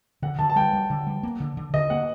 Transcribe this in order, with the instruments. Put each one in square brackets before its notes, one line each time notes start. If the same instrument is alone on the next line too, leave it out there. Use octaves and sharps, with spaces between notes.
[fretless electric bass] D3 [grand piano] F#5
[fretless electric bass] D3 [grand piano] A5
[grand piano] A5
[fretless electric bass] G3 [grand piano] G5
[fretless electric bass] G3
D3
G3
A#3
D3
D3
[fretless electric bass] D3 [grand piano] D#5
[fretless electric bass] A#3 [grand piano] F#5